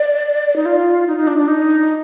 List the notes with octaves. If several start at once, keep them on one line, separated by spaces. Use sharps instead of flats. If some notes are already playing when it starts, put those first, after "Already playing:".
Already playing: D5
D#4
F4
D#4
D#4
D4
D4
D#4